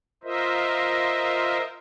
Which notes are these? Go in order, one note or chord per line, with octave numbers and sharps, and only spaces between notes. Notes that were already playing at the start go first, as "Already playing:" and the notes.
F4 A#4 C5 D#5 E5